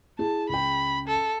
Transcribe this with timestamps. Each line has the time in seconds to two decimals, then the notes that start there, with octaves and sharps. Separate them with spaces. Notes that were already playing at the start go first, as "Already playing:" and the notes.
0.19 E4 G#4 A5
0.49 C#2 G5 B5
1.08 A4